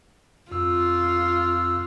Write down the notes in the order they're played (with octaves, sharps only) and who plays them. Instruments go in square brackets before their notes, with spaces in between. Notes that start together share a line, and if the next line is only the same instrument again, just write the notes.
[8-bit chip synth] F2 E6 [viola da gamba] F4